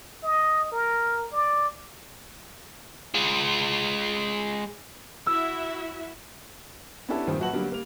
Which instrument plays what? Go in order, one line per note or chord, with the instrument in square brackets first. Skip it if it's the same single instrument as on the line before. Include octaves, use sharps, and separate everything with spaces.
[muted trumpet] D#5
A#4
D5
[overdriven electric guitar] G#3 F4
[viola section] E4 F#4 E5 [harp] E6
[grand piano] B3 C#4 D4 E4 G4 A4
G2 A#2 D#3 F3 C4
A#1 F#3 F#4 B4 A5 F#7
D3 F#3 G3 A#3 B3
G3 A#3 F7